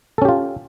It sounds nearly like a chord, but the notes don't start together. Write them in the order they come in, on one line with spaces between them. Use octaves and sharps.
A4 C#4 G4 F4